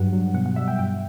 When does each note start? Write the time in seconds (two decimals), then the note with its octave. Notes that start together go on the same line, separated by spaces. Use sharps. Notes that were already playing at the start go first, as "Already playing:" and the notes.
Already playing: G2 F#3 F#5
0.13 F#3
0.34 B2 F#5
0.46 F#5
0.56 G3 E5
0.68 G5
0.79 G2 G5